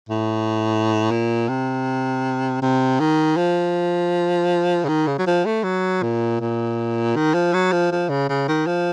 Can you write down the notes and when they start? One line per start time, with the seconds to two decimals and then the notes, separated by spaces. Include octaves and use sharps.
0.09 A2
1.11 A#2
1.49 C3
2.62 C3
3.00 D#3
3.37 F3
4.84 C#3
4.89 D#3
5.07 C#3
5.19 F#3
5.27 F3
5.45 A3
5.64 F#3
6.03 A#2
6.40 A#2
7.16 D#3
7.34 F3
7.54 F#3
7.72 F3
7.92 F3
8.09 C#3
8.29 C#3
8.48 D#3
8.66 F3